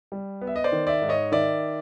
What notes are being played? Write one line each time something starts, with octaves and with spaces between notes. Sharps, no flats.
G3
B3
E5
D#5
C5 D5
D#3
D5 E5
G#2
C#5 D#5
D#3 D5 E5